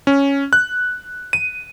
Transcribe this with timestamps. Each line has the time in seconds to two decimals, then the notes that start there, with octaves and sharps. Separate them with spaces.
0.07 C#4
0.53 F#6
1.33 D#7